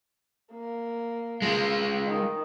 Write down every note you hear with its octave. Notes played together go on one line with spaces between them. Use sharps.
A#3
G#3 F4
D#3